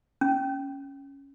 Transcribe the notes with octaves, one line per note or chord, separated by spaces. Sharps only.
C#4